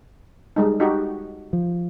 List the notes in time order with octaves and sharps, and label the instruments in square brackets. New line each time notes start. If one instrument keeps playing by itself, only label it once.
[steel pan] G3 G#3 D#4
D#4 F#4 G4
[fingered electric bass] F3